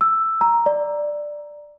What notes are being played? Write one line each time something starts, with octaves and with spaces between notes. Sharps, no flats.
E6
A#5
D5